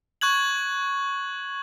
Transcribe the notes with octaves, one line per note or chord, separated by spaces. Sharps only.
C#6 F#6 G#6 F#7